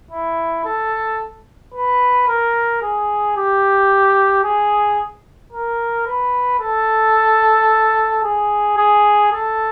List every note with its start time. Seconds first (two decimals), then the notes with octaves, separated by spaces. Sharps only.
0.11 E4
0.65 A4
1.74 B4
2.28 A#4
2.82 G#4
3.37 G4
4.44 G#4
5.53 A#4
6.07 B4
6.60 A4
8.24 G#4
8.78 G#4
9.32 A4